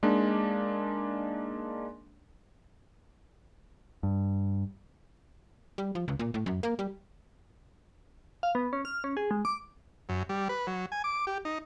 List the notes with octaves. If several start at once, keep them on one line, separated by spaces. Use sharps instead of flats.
G#3 A#3 D4 D#4
G2
G3
F3
C#2
A#2
A2
F#2
A#3
G3
F5
B3
C#4
F6
C#4
G#4
G#3
D6
F#2
G3
B4
F#3
G#5
D6
G4
D#4